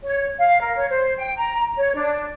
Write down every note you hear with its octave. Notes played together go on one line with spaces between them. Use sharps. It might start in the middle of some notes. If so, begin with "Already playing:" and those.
C#5
F5
A#4
C#5
C5
G5
A#5
C#5
D4